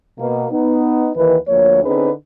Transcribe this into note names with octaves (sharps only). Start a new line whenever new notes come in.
B2 A#3
B3 D#4
D#2 D#3 E3 B4
D2 F3 A#3 C#5
D3 C4 C#4 D#4 G#4 B4